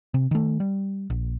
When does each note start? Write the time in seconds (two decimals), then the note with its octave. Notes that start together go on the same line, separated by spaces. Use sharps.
0.14 C3
0.31 D#3 A3
0.60 G3
1.10 A#1